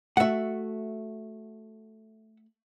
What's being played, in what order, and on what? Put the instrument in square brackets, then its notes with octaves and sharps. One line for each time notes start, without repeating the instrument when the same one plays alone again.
[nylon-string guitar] A3 F#4 [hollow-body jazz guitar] E5 F#5